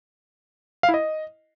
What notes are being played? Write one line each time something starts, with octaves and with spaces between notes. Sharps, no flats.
F5
E4
D#5